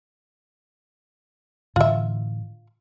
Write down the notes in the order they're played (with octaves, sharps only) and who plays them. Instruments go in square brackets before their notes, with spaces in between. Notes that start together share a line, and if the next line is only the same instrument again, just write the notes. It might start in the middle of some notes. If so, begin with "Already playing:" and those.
[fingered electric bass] A2 D3 E3 [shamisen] F4 E5